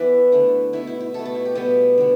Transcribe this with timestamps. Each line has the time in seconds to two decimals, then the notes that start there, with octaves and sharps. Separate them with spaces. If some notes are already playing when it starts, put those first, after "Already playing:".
Already playing: E3 B3 E4 B4 D5
0.32 D3 A3
0.73 B2 B3 E4
0.87 E4
1.00 E4
1.14 B2 A3 A4
1.25 A4
1.35 E4
1.45 G4
1.55 B2 G3 B3 A4
1.98 D3 B3